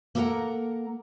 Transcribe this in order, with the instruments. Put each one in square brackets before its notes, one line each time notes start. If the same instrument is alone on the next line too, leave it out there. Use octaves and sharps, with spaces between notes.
[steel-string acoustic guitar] A#3 A4 A#4 D5 F#5 A#5